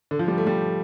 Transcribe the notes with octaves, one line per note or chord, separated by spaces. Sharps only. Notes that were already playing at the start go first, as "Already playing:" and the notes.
D3
F3
G3
A3
G3